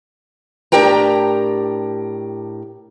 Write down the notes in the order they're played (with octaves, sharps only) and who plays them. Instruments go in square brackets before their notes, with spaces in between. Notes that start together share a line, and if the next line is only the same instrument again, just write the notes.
[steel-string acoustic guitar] A2 D4 G4 A#4 G5 A#5